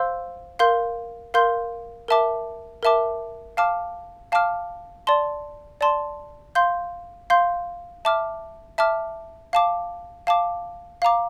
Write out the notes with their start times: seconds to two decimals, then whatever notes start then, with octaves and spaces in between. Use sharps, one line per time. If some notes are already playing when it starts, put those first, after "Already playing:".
Already playing: C5 F5 C6 E6 G6
0.59 A#4 F5 C6 G6
1.34 A#4 F5 C6 G6
2.08 A#4 E5 A5 D6
2.83 A#4 E5 A5 D6
3.57 F5 A5 D6 F6
4.32 F5 A5 D6 F6
5.07 D5 A5 C6
5.81 D5 A5 C6
6.55 F5 C6 G6
7.30 F5 C6 G6
8.05 E5 A5 D6 F6
8.78 E5 A5 D6 F6
9.53 F5 A5 D6
10.27 F5 A5 D6
11.02 F5 A#5 D6